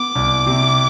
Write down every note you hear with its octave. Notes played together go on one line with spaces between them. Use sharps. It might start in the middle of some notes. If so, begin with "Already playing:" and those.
Already playing: B3 D6
C2
C3